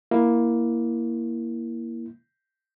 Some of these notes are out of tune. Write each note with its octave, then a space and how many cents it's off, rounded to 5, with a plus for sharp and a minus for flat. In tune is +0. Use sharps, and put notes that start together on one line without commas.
A#3 +10 E4 +0